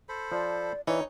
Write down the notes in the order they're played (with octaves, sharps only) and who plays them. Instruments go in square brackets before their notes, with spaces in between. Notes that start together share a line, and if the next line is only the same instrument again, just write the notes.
[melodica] A4 C5 B5
[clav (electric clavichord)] F3 [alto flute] D5
[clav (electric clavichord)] E3 [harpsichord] D#4 C#5 [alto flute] D5